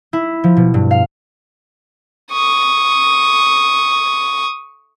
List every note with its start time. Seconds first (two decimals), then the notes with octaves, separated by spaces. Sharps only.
0.13 E4
0.44 F3
0.57 B2
0.74 G2
0.91 F5
2.32 C#6 D#6